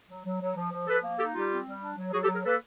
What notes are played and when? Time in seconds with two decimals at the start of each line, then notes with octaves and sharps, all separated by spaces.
0.09 F#3
0.25 F#3
0.41 F#3
0.56 F3
0.71 F3
0.87 F3 A4 B4
1.03 A#3
1.19 D#4 G4 A4
1.34 G3 F4 G4
1.51 C4
1.65 G3
1.82 D4
1.97 F#3
2.13 F#3 F#4 G#4
2.24 G4 A4
2.28 F#3
2.33 G#4 A#4
2.45 A#3 A4 B4